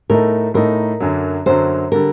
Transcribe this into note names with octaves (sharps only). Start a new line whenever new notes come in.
A2 A3 D#4 A#4
A2 A3 D#4 A#4
F#2 D3 F#3
F#2 D3 F#3 C5
D3 G3 A#4